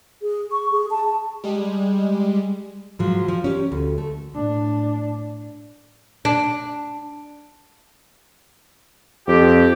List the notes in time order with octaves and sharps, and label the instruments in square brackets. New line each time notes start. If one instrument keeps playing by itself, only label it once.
[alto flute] G#4
C#6
G#4
A5
A5
[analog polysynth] G3 G#3
[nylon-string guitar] G#2 F3 F#3
F3
C#4 G4
D2
A3
[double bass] A2 D4
[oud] D4
[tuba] F2 [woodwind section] G4